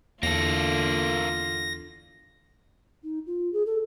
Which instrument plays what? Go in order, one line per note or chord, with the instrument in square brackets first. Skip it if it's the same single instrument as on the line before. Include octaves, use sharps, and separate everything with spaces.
[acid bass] E2 [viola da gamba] D3 F4 [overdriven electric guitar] A#3 A4 [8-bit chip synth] A#6
[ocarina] D#4
F4
G#4
A4